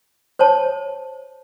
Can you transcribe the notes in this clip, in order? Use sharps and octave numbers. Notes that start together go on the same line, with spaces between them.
C5 C#5 A5